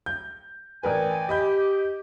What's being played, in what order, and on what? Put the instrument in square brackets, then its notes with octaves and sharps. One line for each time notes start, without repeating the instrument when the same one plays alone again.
[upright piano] G6
[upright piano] A1 A#4 B4 [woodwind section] D5 G5 G#5
[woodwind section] G4 [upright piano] D#5 B5 G6